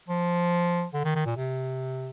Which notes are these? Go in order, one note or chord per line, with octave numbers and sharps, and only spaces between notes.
F3
D3
D#3
D#3
A#2
C3